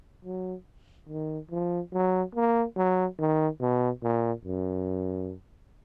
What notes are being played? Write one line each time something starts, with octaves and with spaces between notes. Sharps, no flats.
F#3
D#3
F3
F#3
A#3
F#3
D#3
B2
A#2
F#2